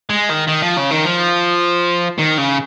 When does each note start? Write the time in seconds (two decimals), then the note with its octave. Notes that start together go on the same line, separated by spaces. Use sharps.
0.10 G#3
0.30 D#3
0.48 D#3
0.62 F3
0.77 C#3
0.91 D#3
1.05 F3
2.18 D#3
2.38 C#3